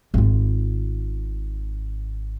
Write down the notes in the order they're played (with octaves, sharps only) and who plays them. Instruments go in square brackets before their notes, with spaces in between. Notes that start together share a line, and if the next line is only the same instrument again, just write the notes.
[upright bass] G#1 F4